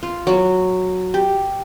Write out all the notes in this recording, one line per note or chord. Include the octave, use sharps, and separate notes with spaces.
F4
F#3 F#4
G4